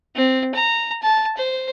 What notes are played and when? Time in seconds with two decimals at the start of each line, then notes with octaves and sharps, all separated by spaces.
0.16 C4
0.55 A#5
1.03 A5
1.38 C5